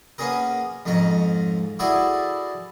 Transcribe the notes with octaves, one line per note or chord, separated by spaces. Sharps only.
A#3 B3 C#4 G#4 A#4
F2 G#2 C#4 A#5
E4 F#4 G#4 A4 D5 E5